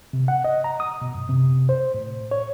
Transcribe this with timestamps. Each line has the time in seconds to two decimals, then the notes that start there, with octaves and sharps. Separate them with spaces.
0.13 C3
0.28 F#5
0.44 D#5
0.64 A#5
0.80 D#6
1.02 B2
1.15 F#2
1.29 C3
1.69 C5
1.94 A2
2.31 C#5